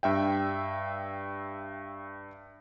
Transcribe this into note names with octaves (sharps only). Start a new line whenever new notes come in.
G2 E5 G5